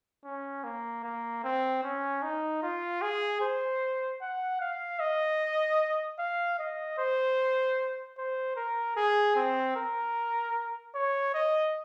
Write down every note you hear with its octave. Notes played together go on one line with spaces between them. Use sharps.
C#4
A#3
A#3
C4
C#4
D#4
F4
G#4
C5
F#5
F5
D#5
F5
D#5
C5
C5
A#4
G#4
C4
A#4
C#5
D#5